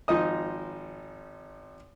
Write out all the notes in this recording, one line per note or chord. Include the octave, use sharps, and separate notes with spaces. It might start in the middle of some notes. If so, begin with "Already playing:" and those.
G#1 F3 D#4 D#5 D#6